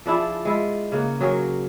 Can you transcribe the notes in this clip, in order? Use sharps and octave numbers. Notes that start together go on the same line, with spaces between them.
F3 D4 E4 G#4
G#3 E4 F4
C#3 A#3 F#5
F#3 G#4 A#4 C#5